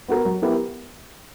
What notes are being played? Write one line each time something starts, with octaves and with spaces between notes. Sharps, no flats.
B3 F#4 A#4
F#3
B3 E4 G4 A#4